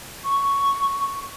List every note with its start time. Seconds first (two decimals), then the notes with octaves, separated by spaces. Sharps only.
0.24 C#6